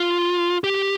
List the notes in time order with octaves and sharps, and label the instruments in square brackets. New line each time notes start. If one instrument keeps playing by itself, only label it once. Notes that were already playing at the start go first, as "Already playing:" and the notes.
Already playing: [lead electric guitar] F4
G4